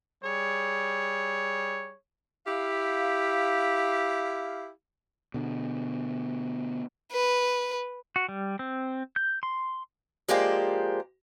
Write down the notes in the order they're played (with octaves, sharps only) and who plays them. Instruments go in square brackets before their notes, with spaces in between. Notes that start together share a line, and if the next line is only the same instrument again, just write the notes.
[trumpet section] G3 G#4 C#5
[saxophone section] E4 G4 F5
[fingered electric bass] B2 D3
[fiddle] B4
[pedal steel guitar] F#4
G3
C4
G6
C6
[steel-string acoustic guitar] F3 G#3 A#3 G4 C5 D5